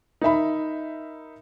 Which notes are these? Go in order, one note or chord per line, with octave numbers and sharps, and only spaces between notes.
D#4 A#4 E5 B5